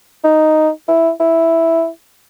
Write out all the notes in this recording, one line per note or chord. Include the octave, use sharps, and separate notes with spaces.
D#4
E4
E4